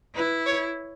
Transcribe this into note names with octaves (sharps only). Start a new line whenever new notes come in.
E4 B4
C#5